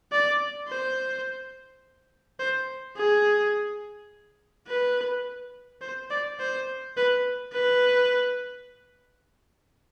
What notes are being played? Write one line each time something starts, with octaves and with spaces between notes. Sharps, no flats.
D5
C5
C5
G#4
B4
C5
D5
C5
B4
B4